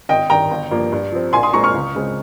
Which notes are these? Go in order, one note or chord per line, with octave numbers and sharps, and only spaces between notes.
G#1 D#5 G5
G2 D#3 G5 A#5
G1
G2 F3 A#3
G2
F3 C4
A#1 G#5 C6
C6 D#6
A#2 G#3 C4 A#5 C#6
C#6 F6
C#2
C#3 G#3 C4